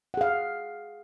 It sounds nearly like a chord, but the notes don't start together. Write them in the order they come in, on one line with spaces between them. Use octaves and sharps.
F#5 G#4 F5